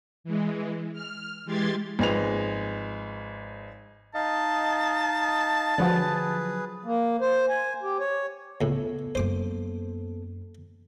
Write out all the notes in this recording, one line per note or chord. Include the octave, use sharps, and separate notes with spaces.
E3 G#3
F6
E3 G#3 G4 C6 G#6 A6
G#1 F3 G#3 B4 F7
D#4 D#5 F5 A5
D3 F3 F#3 G#4 B4
A#3
C5
G#5
G4
C#5
C#2 A2 B3 A4
F#2 A#3 C5 D6